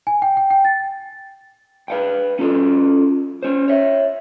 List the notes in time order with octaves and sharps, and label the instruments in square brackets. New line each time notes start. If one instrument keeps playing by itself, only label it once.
[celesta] G#5
G5
G5
G5
A6
[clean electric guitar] B4 F5 G5
C#4 F4 A4
C#4 C5
C#5 E5